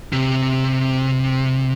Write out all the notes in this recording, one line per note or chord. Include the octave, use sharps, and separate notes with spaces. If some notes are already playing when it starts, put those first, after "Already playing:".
C3